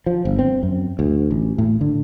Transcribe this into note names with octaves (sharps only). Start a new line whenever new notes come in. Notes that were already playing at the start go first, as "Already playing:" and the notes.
F3
G1
C4
F#2
D2
A1
A2
D3